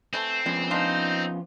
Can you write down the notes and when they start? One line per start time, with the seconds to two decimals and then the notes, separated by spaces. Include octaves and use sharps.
0.13 E3 A3 C4
0.46 F3 G#3 B3 C#4
0.71 D4 D#4 F4